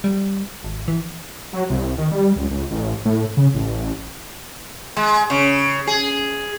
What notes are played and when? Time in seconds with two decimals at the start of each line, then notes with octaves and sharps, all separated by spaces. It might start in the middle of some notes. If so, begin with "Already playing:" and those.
0.04 G3
0.64 G#1
0.88 E3
1.53 F#3
1.70 C2
1.98 D#3
2.11 G3
2.36 C#2
2.51 C#2
2.71 A1
3.05 A2
3.37 C#3
3.54 A1
4.97 G#3
5.30 C#3
5.87 G#4